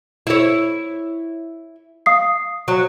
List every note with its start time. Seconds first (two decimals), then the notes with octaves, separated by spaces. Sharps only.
0.27 E4 C#5
2.06 F5 D#6 C7
2.68 F#3